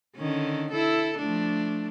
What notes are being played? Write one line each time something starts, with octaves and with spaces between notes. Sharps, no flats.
D3 D#3 C#4
E4 A4
F3 A3 D4